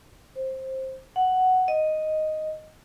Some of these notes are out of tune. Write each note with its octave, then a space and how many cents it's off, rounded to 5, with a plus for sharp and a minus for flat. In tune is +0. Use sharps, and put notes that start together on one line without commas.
C5 +15
F#5 +5
D#5 +0